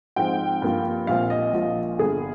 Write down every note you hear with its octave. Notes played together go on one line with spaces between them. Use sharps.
G#2 F3 G#3 C4 G5
G2 F3 A#3 F4
A#1 A#2 F3 C4 F4 F5
D#5
A#1 A#2 F3
G1 G2 D3 G#4